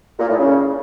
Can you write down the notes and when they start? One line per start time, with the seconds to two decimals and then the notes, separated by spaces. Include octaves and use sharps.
0.19 A#2
0.28 A2
0.38 C#3